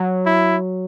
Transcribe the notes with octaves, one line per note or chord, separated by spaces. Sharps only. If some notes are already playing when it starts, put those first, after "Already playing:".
Already playing: F#3
E4